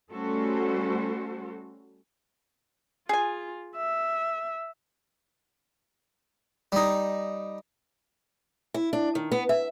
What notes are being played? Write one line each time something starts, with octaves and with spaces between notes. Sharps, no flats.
G3 A3 C#4 F#4 A4 C5
F4 G#4 G#5
E5
G3 D#4
E4
D4
D#3
B3
E5